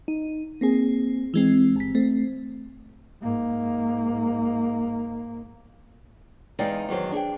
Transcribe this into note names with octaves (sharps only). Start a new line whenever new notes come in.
D#4
A#3 C4 G#4
E3 G#3 C4
G1 B6
A3 C4
G#2 A#3
E2 G#3 D#4 D5 F5 G5
E2 D#3 F#3 C5
D4 G#4 G5